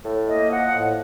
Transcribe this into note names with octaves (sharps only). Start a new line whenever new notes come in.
A2
A#3 D#5
F3 F#5
A2